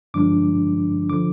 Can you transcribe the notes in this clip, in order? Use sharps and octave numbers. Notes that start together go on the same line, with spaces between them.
G2 D3 F3 G#3 D4 D6
D3 F3 D6